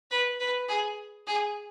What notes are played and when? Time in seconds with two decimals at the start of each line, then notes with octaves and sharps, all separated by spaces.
0.11 B4
0.40 B4
0.68 G#4
1.27 G#4